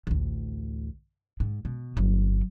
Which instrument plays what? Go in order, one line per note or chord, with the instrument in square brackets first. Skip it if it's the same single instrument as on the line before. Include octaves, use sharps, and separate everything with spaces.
[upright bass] A1 D2
G#2
B2
G1 F#3